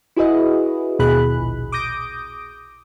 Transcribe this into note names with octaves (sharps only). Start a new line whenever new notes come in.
E4 F#4 G#4 B4 D#5
D#2 B2 G#4 B5 F#6
A#1
D6 D#6 G6 A#6 D7